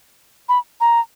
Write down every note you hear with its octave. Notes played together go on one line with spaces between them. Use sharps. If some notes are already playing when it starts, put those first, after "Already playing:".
B5
A#5